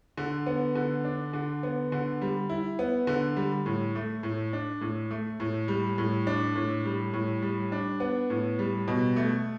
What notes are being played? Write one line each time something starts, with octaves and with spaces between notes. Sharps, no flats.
D3
B3
D3
D4
D3
B3
D3
G3
E4
B3
D3
G3
A2
A3
A2
D4
A2
A3
A2
G3
A2
D4
A2
G3
A2
G3
D4
B3
A2
G3
B2
A3